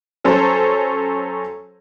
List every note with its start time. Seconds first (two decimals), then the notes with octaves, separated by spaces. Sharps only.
0.24 F#3 C#4 A4 C5